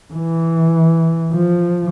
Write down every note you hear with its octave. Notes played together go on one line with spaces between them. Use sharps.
E3
F3